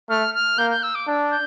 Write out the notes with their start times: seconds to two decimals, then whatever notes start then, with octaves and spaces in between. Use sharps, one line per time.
0.09 A3 F6
0.34 F6
0.58 A#3 G6
0.70 G6
0.83 E6
0.95 D6
1.07 D4
1.31 G6